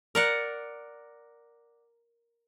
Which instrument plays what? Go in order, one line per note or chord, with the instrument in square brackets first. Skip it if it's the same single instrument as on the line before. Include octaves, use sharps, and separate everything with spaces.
[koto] A#4 D5 F#5